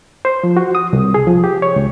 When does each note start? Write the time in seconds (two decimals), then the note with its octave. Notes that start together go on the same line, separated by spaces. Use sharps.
0.25 C5
0.44 F3
0.57 F#4
0.75 D#6
0.93 C2
1.14 G#4
1.27 F3
1.44 G4
1.62 C#5
1.76 C#2